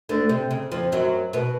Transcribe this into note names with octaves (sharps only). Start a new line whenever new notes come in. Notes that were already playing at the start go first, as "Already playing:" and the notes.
D2 D3
C3
C#3
F2 F3
F#2 F#3
B2 B3